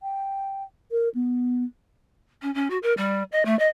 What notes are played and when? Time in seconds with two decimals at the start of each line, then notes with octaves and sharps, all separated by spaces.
0.03 G5
0.91 A#4
1.15 B3
2.42 C#4
2.55 C#4
2.70 F#4
2.83 A#4
2.97 G3
3.32 D#5
3.45 A3
3.59 D#5